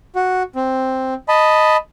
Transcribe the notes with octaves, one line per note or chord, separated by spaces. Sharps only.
F#4
C4
D#5 A5 B5